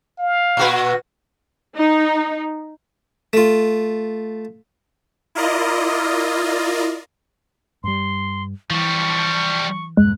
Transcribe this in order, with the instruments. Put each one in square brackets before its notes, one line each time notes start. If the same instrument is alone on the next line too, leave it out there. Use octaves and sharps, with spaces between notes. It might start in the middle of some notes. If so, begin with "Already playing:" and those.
[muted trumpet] F5
[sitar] A#2 F#4 B4
[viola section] D#4
[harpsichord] A3 F4
[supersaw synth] E4 F4 A#4 D5 D#5
[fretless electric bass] G2 G3 [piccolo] C6
[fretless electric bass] E3 [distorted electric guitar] F3 G3 [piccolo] C#6
[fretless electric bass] E2 G2 A#2 [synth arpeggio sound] G#3 [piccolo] F#6